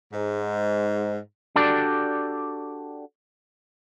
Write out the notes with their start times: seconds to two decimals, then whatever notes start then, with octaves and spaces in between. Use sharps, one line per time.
0.13 G#2
1.56 D4 F#4 G4 A4 D5